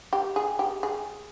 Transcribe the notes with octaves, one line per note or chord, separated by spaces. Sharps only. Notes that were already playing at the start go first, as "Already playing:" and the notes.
G4
G#4
G4
G#4